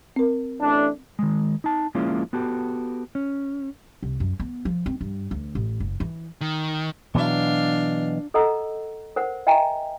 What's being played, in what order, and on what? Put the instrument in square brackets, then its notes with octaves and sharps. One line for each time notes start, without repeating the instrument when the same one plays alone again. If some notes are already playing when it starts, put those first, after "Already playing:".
[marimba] C4 A#4
[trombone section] A1 A3 D4
[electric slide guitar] D#3 G#3
D#4 A5
F3 G#3 A#3 C#4 E4 F4
B3 F#4 G4 A4
C#4
[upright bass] C2
F#2
B3
F3
C4
G2
D2
A1
F#1
E3
[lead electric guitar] D#3
[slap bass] B2 E3 F#3 [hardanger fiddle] D4 F5
[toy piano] A4 D#5 F#5 A#5 E6
A#4 C5 F#5
D#5 E5 G5 G#5 A#5